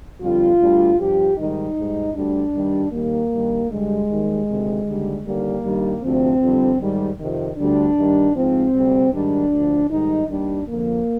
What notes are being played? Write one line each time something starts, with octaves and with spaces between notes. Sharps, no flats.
F2 D3 G3 F4
D2 D3 G3
G2 F3 G4
G#2 D#3 G3 D#4
G#2 G3
D2 D3 G3 D4
G2 D#3 G3
D#2 D#3 G3 A#3
G2 D#3 G3
G2 D3 G3 G#3
D#2 D#3 G3
D2 C3 D#3
D#2 D3 G3
D#2 D3 G3 A#3
G2 D#3 G3
D2 C3 F3 C4
F2 D3 G3
G#2 D#3 G3
F2 C3 D#3
D2 D3 G3 D4
G2 D#3 G3
G#2 F3 C4
D2 C3 G3
G#2 D#3 G3 D4
D2 D3 F3
G#2 D#3 G3 D#4
D#2 D#3 G3 D4
F2 D3 F3 A#3